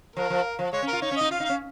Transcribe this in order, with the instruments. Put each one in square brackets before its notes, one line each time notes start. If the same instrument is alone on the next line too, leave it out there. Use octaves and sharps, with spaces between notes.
[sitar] F3 [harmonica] A#4
[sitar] F3
F3
[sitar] G#3 [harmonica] C#5
[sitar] C#4
[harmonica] A#4
[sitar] F4
[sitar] D#4 [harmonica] C#5
[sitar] C#4
[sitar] D#4 [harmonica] D#5
[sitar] F4 [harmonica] F5
[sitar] D#4
[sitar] C#4 [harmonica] F5